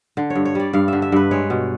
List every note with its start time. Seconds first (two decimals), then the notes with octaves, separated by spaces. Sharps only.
0.17 D3
0.30 C#5
0.35 G2
0.45 C#5
0.55 G3 D5
0.73 G2 F5
0.88 D3 E5
1.02 E5
1.12 G2 B4
1.31 G#3 C#5
1.50 B2